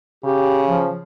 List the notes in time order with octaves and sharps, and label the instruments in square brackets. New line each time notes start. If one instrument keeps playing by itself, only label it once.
[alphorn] C#3 [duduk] G4
[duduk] F3